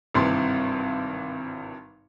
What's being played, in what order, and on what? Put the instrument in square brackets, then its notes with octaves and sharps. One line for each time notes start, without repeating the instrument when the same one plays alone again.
[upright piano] G#1 G2 C3 E3 C6